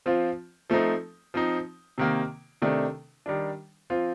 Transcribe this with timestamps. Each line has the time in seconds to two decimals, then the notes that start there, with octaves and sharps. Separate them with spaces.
0.06 F3 C4 F4
0.70 F3 A3 C4 D#4
1.34 F3 C4 D#4
1.98 C3 D#3 A#3
2.62 C3 D#3 A3 D4
3.26 D#3 G3 D4
3.90 F3 C4 F4